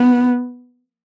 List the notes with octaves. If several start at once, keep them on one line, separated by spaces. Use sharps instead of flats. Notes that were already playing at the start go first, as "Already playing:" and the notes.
Already playing: B3